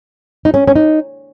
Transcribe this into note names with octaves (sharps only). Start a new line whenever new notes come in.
D#4
C#4
C#4
D#4